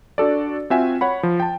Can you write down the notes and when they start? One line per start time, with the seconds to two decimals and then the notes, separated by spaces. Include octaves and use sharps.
0.18 D4 F#4 A4 D5
0.70 C4 F4 F#4 E5 F#5 G#5
1.01 C#5 F#5 B5
1.23 F3
1.40 G5 A5